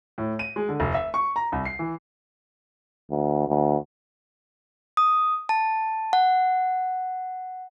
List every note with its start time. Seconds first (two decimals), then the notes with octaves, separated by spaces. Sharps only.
0.18 A2
0.39 D#7
0.56 G#3
0.69 D3
0.80 F1
0.94 E5
1.14 C#6
1.36 A#5
1.52 C2
1.65 C7
1.79 E3
3.10 D2
3.48 D2
4.97 D#6
5.49 A5
6.13 F#5